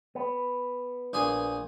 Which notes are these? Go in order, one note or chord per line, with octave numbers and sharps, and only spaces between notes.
B3
A#1 G#4 G#5